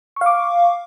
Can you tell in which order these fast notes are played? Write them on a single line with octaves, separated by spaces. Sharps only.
C#6 F5 D6